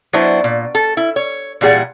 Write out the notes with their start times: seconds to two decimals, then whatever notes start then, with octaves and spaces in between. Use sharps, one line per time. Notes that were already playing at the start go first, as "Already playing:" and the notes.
0.13 F#3 B3 D4 E4 C5
0.44 A#2
0.75 A4
0.97 E4
1.16 C#5
1.61 A#2 E3 G3 G#4 D5 F#5